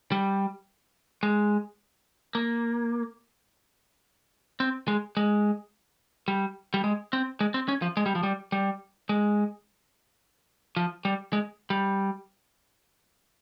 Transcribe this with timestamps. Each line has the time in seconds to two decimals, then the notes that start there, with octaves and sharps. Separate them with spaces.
0.12 G3
1.23 G#3
2.35 A#3
4.60 C4
4.88 G#3
5.17 G#3
6.28 G3
6.74 G3
6.84 G#3
7.13 C4
7.41 G#3
7.54 C4
7.68 C#4
7.82 F3
7.97 G#3
8.06 G3
8.15 F3
8.23 G3
8.52 G3
9.09 G#3
10.77 F3
11.05 G3
11.33 G#3
11.70 G3